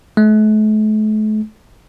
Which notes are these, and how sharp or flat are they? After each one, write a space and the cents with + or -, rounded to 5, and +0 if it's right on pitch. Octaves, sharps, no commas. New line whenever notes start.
A3 -40